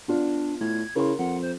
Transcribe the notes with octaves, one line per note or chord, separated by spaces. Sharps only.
B3 D4 F4 D5
A2 G#6
C#3 E4 A#4 C6
F2 F#5
C5